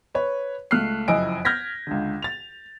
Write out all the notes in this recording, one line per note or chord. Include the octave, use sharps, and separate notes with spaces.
B4 C#5
C#2 A3 F6 F#6 C7
F#1 F2 E4 D#5 G#5 D7
F6 G6 G#6 A#6 B6
C#2 D3
A6 F7